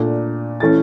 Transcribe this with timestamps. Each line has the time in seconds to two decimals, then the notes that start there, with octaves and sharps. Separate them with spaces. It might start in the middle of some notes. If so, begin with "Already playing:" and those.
Already playing: A#2 A3 D4
0.60 E3 A3 C#4 A6